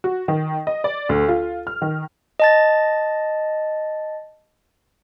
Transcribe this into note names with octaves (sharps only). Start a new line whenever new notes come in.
F#4
D#3
D#5
D5
D2
F4
F6
D#3
D#5 A5 A6